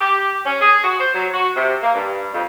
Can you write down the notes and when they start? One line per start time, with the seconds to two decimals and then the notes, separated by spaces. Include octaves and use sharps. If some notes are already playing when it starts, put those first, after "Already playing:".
0.01 G4
0.45 C#4
0.61 G#4
0.84 F#4
1.00 C5
1.15 F#3
1.34 F#4
1.56 C3
1.82 A#3
1.95 G2
2.34 F2